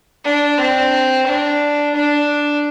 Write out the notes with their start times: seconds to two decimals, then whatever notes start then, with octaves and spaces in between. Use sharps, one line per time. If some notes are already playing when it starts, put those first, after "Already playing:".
0.25 D4
0.58 C4
1.26 D4
1.95 D4